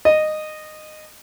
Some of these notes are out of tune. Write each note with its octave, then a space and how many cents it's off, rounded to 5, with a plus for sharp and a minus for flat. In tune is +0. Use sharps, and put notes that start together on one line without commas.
D#5 -15